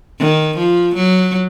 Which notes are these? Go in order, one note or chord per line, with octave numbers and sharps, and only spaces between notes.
D#3
F3
F#3